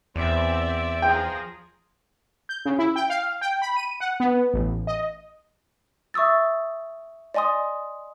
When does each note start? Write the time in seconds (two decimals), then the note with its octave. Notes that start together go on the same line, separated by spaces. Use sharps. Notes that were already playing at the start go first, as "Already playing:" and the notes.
0.16 E2 C4 D5 E5
1.02 F3 G#4 G5 A#5
2.49 G6
2.65 C#3
2.79 E4
2.96 G5
3.10 F5
3.41 G5
3.62 B5
3.76 D#7
4.00 F#5
4.20 B3
4.53 A1
4.87 D#5
6.14 E5 C#6 D#6 E6 A6
7.34 D5 D#5 G#5 C6 D#6